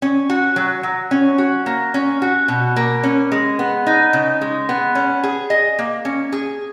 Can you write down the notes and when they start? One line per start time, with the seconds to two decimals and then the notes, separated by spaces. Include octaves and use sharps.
0.02 C#4
0.30 F#4
0.56 F#3
0.83 F#3
1.11 C#4
1.38 F#4
1.66 A#3
1.94 C#4
2.22 F#4
2.48 B2
2.76 A#3
3.03 C#4
3.32 G#3
3.59 B3
3.87 D#4
4.13 C#3
4.41 G#3
4.69 B3
4.95 C#4
5.24 G#4
5.50 D#5
5.79 A#3
6.05 C#4
6.32 G#4